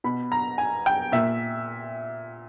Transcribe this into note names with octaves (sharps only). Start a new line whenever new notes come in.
B2 B5
A#5
G#5
G5
A#2 E5